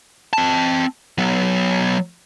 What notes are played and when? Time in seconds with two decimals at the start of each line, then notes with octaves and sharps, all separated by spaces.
0.33 C4 A5
1.18 F#3 B3